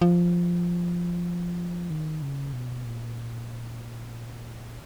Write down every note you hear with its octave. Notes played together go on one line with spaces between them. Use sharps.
F3
D#3
C#3
B2
A#2